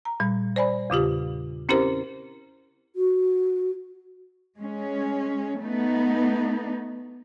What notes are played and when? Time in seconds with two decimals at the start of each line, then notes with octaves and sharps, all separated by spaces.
0.05 A#5
0.20 A#2 G3
0.56 C5 D5 G#5 B5
0.90 E2 C#3 F4 G4
1.69 C4 C#4 E4 G4 A#4 C5
2.96 F#4
4.58 G#3 C#4
5.59 A3 B3 D#4